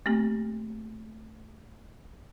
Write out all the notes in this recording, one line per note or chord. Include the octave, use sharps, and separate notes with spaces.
A3 A#3 C4 G4